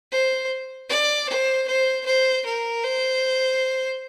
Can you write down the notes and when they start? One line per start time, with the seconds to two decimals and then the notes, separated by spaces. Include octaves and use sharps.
0.12 C5
0.89 D5
1.29 C5
1.68 C5
2.06 C5
2.45 A#4
2.83 C5